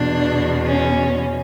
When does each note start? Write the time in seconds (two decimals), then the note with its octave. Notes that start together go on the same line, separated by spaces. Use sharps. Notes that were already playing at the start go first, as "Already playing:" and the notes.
Already playing: E2 B2 D4
0.66 C#4